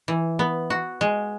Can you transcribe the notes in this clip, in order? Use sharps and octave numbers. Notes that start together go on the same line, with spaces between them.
E3
B3
F#4
G#3